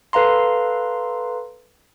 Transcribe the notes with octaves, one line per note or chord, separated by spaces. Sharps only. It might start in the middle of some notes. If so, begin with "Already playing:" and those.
A4 B4 F5 A#5 C6